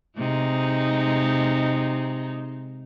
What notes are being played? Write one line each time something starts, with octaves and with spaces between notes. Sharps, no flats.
C3 G#3 D#4